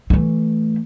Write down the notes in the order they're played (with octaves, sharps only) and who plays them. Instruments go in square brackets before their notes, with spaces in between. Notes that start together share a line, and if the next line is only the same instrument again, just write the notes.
[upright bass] E3 A3